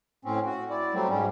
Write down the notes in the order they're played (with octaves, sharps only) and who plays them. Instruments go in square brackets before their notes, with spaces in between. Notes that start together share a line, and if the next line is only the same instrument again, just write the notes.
[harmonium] A2 C4 C#4
F#4
E4 D5
F#3 G3 A3 C4
G#2 G3 C#4